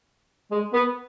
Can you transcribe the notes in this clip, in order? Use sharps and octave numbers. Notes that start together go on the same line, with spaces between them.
G#3
B3